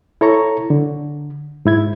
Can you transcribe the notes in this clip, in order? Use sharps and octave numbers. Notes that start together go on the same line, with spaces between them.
E4 A4 C#5 A#5 C#6
D3
G#2 E4 G#6